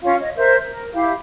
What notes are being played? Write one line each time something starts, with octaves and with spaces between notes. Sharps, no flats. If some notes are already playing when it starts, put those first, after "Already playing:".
C#4 F4 F5
C#5 D#5
A#4 C5 E5
A#4
E4 G4 F5